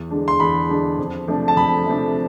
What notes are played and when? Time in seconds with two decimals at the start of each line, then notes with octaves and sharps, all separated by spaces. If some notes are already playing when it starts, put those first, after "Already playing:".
Already playing: E2
0.10 D3 G#3 D4
0.28 C6
0.40 E2 B5
0.69 D3 G#3 D4
0.98 F2
1.28 C3 F3 A3 D4
1.48 A5
1.56 F2 B5
1.86 C3 F3 A3 D4